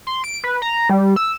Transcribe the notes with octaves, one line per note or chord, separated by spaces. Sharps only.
C6
D7
B4
A#5
G3
E6